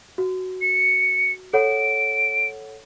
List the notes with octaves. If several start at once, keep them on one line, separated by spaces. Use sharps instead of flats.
F#4
C#7
A4 C#5 F#5 D7